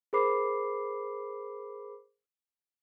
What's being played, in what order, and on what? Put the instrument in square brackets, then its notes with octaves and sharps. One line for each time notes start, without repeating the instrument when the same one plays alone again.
[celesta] G#4 A#4 C5 B5 D6 C7